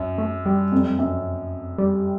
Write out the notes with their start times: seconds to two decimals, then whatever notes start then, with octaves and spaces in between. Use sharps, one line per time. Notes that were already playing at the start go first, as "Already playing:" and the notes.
Already playing: F#2
0.18 A3
0.46 G3
0.72 F2
0.99 F#2
1.78 G3